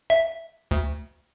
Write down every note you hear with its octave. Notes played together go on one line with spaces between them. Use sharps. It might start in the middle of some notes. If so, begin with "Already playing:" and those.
E5
D2